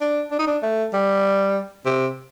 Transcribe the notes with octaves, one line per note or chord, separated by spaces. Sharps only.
D4
D4
D#4
D4
A3
G3
C3